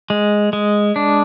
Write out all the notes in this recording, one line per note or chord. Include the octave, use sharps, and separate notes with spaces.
G#3
G#3
D4